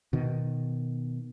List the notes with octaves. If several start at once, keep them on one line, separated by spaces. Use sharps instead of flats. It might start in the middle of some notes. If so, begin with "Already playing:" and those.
B2 D#3